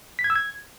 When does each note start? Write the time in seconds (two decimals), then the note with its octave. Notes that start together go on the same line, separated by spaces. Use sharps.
0.19 B6
0.24 G#6
0.30 E6
0.36 G#6